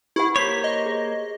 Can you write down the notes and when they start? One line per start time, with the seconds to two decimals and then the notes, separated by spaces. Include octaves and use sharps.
0.16 E4 G4 B4 F#5
0.36 A#3 C5 C#5 B6
0.64 D#5
0.86 G#4